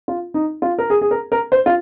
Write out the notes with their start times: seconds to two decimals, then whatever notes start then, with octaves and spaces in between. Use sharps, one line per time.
0.08 F4
0.34 D#4
0.62 F4
0.79 A#4
0.90 G#4
1.01 G#4
1.11 A#4
1.32 A#4
1.52 C5
1.66 F4